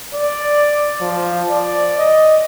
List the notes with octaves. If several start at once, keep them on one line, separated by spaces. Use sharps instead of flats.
D5
F3
D5
D#5